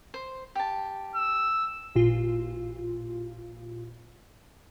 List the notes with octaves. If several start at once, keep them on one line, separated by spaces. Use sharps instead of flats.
C5
G4 A5
E6
A1 A#2 F4